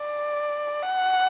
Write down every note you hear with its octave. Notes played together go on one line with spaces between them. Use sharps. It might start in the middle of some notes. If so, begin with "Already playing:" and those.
Already playing: D5
F#5